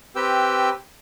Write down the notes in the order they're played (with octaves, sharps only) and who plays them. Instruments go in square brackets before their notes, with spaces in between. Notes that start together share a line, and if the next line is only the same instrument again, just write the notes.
[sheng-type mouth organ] C4 G4 B4 G5 E6